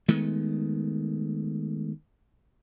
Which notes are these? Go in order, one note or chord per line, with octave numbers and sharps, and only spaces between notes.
D#3 G#3 A3 B3